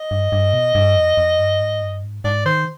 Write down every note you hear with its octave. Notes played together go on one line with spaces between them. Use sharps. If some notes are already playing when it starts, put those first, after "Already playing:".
Already playing: D#5
G2
G2
B2
G2
F2
F2
G2
G#2
G2
G#2
G#2 D5
D#3 C5